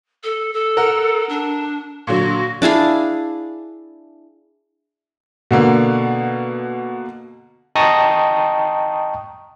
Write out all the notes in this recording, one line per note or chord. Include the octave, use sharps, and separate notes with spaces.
A4
A4
A#4 F#5
D4
A#2 D3 F#3 F#4
D4 E4 G#4 F5
B2 D3 A#3
D#5 G5 A5 A#5 C#6 D#6